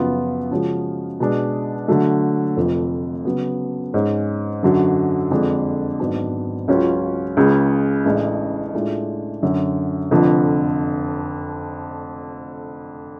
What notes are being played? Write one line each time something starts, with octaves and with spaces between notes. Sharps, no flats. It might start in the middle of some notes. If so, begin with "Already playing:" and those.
Already playing: F#2 C#3 F3 B3 F4
C#3 F3 G#3 C#4 F#4
B2 G#3 D4
D3 F#3 A3
F1 F2 F3
C#3 F#3 B3
G#2 G#3 C#4
F#2 D3 F#3
F2 D3 G#3 D4
G#1 G#2 F#3 B3 D4
C#2 C#3 F#3 C#4 F4
C#2 C#3 G#3
A1 A2 G#3 D4
A2 G#3 D4 F4
F#2 D3 F#3 C#4
F1 F2 D3 F3